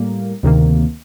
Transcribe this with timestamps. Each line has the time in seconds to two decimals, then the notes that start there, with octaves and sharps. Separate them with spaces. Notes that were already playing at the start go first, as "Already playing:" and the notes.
Already playing: A2 G3 A#3
0.43 D2 C3 D#3 A#3